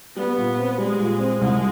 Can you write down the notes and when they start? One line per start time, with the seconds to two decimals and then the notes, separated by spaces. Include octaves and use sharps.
0.16 G3 B3
0.37 A#2
0.58 C4
0.78 G3 G#3
0.99 A#2
1.19 C4
1.40 C2 G#3